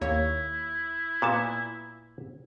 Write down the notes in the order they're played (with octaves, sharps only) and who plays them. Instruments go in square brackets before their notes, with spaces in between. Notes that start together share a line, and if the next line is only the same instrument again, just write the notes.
[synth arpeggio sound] D#2 A#3 C#5 [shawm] E4
[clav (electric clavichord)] A#2 B3 A5